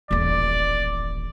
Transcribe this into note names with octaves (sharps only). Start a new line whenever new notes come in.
D#1 A1 D5